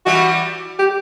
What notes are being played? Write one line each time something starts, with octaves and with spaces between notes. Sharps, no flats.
E3 G3 F#4
G4